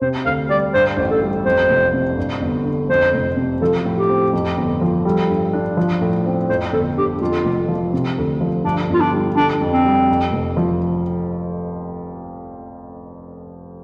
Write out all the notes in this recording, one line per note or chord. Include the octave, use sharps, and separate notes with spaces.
C3 C5
D2 F5
G3 D5
G2 C5
A1
A4
G3
F2 C5
F1
C3
G2
G1
D3
F2 C5
F1
C3
F3 A4
A2
G4
C4
F2
G1
F3
G3 A4
G2
D4
F3
A2
C4
F2 C5
G1 A4
D3 G4
F2 F4
F1
F3
C3
D2
F3
G2 D4
G1 F4
D4
G3
D3 D4
F2
C4
G3
F2
F1
F3